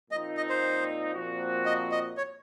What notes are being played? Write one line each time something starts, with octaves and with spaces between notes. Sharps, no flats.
A#2 F3 C4 D#4 D#5
D#5
C5
A#2 F3 C4 F#4
D#5
D#5
C#5